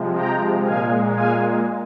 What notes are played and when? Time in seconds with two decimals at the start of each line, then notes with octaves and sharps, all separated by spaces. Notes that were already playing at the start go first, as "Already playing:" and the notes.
Already playing: C3 F3 G#3
0.14 G5 A#5
0.63 A#2 G#3 F5 G#5
1.12 F5 G#5